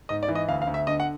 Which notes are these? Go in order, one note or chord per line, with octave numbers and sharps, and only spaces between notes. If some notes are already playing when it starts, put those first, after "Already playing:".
G#2 D#5
D5
E3
D#5
D2 F5
F5
D2
E5
D3 D#5
F#5